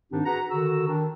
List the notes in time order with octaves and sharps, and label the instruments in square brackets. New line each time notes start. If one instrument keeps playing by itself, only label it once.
[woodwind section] G#2 D#3 C4 D4 D#4 G4
F#4 G#4 B4 F#5 A#5
D3 D#3 F#4 A#5 E6
D#3 D4